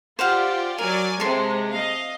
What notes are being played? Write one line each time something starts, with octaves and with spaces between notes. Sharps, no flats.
F4 G4 C5 D5 F5 F#5
F#3 A#4 D5 G#5
C3 G#3 A4 C6
D#5 F5